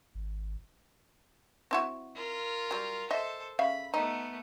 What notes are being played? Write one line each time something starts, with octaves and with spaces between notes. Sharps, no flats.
G#1
C4 E4 F#4
F4 A#4
F#3 G3
A4 C5 D#5 E5
C#3 E5 F5 B5
A3 B3 D#4